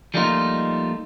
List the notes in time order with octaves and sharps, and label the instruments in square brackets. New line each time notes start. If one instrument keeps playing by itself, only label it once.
[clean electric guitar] F3 G3 A3 A#3 D#4 F4